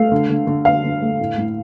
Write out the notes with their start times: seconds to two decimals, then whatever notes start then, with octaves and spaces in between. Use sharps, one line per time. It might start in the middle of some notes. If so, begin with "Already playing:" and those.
Already playing: A3 F5
0.12 D3
0.30 D3
0.47 D3
0.65 D3 F5
0.84 D3
1.02 A3
1.20 A2
1.38 A2